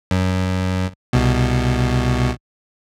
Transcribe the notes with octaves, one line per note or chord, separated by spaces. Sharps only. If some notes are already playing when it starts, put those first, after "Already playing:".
F#2
C2 B2